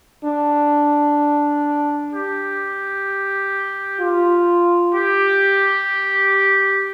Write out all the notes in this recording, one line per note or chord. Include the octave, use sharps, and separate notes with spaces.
D4
G4
F4
G4